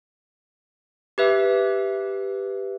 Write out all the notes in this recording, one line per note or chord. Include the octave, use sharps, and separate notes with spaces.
G4 B4 E5